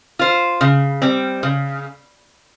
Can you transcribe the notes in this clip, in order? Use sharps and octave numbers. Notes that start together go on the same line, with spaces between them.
F4 C5
C#3
G3 C4
C#3